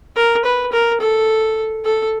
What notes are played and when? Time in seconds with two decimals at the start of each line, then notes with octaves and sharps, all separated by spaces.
0.16 A#4
0.45 B4
0.72 A#4
1.01 A4
1.85 A4